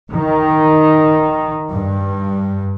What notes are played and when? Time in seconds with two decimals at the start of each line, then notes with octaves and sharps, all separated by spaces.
0.12 D#3
1.71 G2